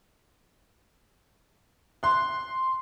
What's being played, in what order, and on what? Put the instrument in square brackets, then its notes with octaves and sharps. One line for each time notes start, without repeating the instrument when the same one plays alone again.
[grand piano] C6 F#6